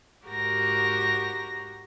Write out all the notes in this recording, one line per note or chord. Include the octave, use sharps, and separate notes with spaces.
G#2 F#4 G4 A#4 A#6